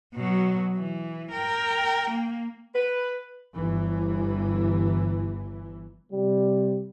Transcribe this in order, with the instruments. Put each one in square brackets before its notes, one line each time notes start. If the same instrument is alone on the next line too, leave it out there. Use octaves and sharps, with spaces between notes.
[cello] B2 F#3
E3
A#4 G5
A#3
[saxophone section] B4
[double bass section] G1 E3
[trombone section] C3 G3